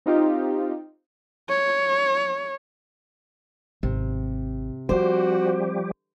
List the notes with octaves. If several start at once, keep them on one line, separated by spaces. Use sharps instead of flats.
C4 D#4 F4 G4
C#5
G#1 C3
F3 G3 A#3 C4 F#4 G4 C5